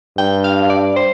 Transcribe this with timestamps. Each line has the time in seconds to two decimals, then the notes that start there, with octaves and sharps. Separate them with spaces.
0.17 G2 G5
0.44 F5
0.70 D5
0.96 C5